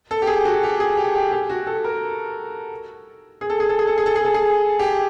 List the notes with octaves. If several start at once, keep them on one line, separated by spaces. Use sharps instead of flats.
A4
G4
G#4
F#4
G4
G#4
G4
G4
G4
F#4
A4
A#4
G#4
A4
G#4
A4
G#4
A4
G#4
A4
G#4
A4
G#4
G4